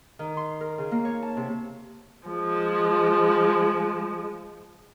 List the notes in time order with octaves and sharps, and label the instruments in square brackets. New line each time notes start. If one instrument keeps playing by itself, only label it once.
[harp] D#3
C6
A#4
C#3
A#3
C#5
A5
C3
[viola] F3 G#3